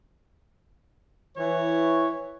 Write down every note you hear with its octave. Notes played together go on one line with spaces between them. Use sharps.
E3 C#5